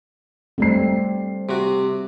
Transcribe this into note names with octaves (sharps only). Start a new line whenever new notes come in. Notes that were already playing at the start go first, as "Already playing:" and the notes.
G3 A3 C4 C7
C3 F#4